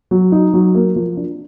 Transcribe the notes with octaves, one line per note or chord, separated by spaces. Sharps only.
F#3
D#4
F#3
A#3
F3
D4